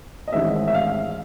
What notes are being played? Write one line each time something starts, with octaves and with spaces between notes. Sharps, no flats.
D#5
A1 G#2 D#3 G#3 C4 E5
E5
F5